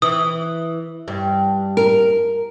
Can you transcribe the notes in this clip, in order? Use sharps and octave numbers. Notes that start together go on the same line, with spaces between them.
E3 D#6
G2
A#4